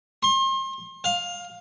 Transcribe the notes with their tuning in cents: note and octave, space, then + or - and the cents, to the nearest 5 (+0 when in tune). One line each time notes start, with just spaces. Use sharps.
C6 +35
F5 +15